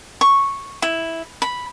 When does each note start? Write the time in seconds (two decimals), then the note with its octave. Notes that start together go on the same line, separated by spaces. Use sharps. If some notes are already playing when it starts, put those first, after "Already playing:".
0.21 C#6
0.82 E4
1.42 B5